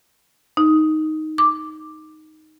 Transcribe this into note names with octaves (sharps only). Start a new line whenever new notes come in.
D#4
D6